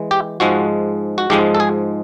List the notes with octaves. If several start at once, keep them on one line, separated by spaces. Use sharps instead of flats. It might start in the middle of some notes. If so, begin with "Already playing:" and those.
Already playing: E3 G#3
G4
G#2 F3 G#3 F#4
F#4
G#2 F3 G#3 G4
A4
G#4